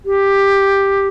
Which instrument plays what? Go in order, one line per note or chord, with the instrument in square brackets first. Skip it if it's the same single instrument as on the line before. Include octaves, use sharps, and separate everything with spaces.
[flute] G4